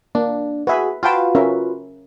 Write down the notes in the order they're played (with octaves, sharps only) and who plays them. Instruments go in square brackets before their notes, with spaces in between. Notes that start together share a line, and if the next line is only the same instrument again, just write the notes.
[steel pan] A#3 [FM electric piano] D4
[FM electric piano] F#4 G#4 [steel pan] B4 E5
[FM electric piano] F4 F#4 B4 [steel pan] F5 G5 A5
[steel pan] C#4 A#4 E5